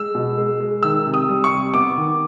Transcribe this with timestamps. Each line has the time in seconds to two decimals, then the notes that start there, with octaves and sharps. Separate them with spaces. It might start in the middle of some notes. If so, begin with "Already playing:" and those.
Already playing: G#3 E6
0.15 B2
0.38 G#3
0.60 G#3
0.83 D#3 E6
1.06 C3
1.14 D#6
1.29 G3
1.44 C#6
1.51 C3
1.74 B3 D6
1.97 D#3